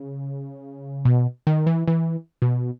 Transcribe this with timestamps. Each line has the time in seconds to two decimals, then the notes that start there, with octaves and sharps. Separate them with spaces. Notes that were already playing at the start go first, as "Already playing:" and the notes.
Already playing: C#3
1.05 B2
1.47 D#3
1.67 E3
1.88 E3
2.42 B2